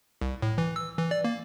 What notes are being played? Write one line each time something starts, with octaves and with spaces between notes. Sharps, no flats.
C2
A2
E3
E6
E3
D5
A#3